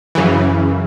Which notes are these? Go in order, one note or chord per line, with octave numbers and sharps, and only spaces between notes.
F#2 C#3 E3